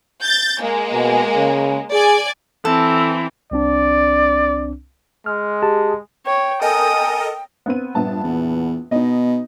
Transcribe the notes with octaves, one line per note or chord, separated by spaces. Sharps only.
G6 A6
G#3 A#3
B2
C#3
G#4 D5 G#5
E3 C4 A4
C2 C4 D4 D5
G#3 F6
G4 G#4 A5
C#5 G5
A4 A#4 D#5 G#5 D#6
B3 C4 D#7
A#1 G2 B3 A5
E2
B2 D#4 D#5